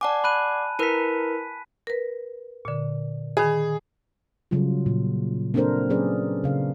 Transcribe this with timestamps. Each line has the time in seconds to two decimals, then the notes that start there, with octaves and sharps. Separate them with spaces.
0.01 D5 F#5 G#5 A5 D6
0.24 B5 F#6 D#7
0.79 E4 A#4 B4 B6 D#7
1.87 A#4 B4
2.65 A#2 D3
3.37 D#3 G#4 B5
4.51 C#3 F#3 G3 F4
4.86 A#2
5.54 A#3 C4 D4 A4 A#4 C5
5.90 F#3 C#4 G#4 B4 D5
6.44 C#3 F5